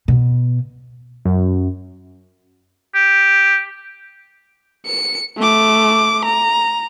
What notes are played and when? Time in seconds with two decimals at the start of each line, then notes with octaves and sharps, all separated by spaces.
0.08 B2
1.25 F#2
2.95 G4
4.86 C#7
5.38 A3 D6
6.25 A#5